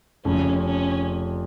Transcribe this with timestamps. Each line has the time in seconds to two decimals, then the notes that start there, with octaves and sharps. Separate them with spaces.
0.25 F1 F2 C#3 F3 C#4
0.65 C#4